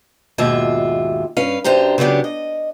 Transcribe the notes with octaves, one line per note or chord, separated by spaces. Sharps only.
D#2 G#2 B2 F4 E5
G2 C#4 B4 F5
F#2 D4 G4 C5 A#5
C#3 F#3 B3 D4 G4
D#5